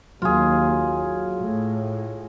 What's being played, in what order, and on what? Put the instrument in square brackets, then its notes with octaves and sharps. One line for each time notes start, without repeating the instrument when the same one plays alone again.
[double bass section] D#2 [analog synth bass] F#3 [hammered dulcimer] F4 G#4
[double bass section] A2